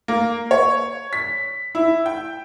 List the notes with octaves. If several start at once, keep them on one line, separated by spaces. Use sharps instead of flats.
A#3
C#5
B6
E4
G5